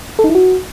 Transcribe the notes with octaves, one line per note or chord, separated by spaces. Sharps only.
A4
D#4
E4
F#4